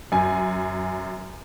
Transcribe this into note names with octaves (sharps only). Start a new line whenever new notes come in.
F#2 G#5